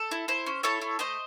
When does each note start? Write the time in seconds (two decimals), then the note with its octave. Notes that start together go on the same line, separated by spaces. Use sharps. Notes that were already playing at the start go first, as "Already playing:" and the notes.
Already playing: A4
0.11 E4
0.28 E4 C5
0.46 C#4
0.63 E4 A4 C#5
0.81 E4
0.99 A3 C5 D#5